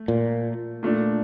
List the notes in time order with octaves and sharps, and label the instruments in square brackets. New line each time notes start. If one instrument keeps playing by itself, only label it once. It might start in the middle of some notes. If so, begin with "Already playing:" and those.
Already playing: [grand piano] A3
[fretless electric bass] A#2
[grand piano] A#2 A3 D4